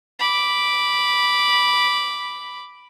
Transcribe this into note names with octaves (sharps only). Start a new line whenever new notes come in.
B5 D6